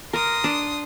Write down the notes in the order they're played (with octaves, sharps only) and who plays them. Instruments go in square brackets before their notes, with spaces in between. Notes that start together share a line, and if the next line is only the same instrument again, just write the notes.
[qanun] A#4 [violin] C6 D#6
[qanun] D4